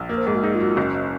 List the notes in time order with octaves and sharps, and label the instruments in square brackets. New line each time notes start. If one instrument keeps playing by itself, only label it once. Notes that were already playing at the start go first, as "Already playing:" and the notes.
Already playing: [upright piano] A#1
[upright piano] A#3 [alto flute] A#4
[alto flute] C5
[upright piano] G#2 [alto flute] G#4
[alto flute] F#4
[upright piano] D#4 [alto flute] G#4
[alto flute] F4
[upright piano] F#3
[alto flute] F4
[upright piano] F#1 [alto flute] C#4